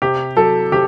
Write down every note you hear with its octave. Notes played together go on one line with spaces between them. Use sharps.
C3 G4
F#3 A4
C3 G4